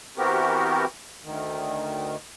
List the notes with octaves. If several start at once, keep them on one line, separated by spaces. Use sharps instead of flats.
E3 B3 C4 F#4 G4 A#4
D2 D#3